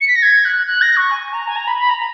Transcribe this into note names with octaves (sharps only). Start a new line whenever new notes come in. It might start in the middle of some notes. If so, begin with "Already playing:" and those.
C#7
B6
A#6
G#6
F#6
F#6
A#6
C#6
G#5
A#5
G#5
A#5
B5
B5
A#5